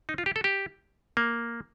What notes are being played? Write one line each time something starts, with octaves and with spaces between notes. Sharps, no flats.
D#4
F4
G4
A4
G4
A#3